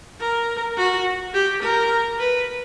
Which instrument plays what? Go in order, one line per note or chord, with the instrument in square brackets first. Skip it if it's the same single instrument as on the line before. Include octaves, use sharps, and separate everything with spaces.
[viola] A#4
F#4
G4
A#4
B4